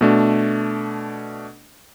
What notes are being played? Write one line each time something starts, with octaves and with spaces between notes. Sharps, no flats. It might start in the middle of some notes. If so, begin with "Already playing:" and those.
B2 A3 D4